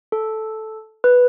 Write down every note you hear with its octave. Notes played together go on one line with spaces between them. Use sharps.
A4
B4